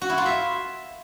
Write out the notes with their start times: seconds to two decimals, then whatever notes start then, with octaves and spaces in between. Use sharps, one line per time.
0.02 F#4
0.10 E4
0.18 F4
0.26 E5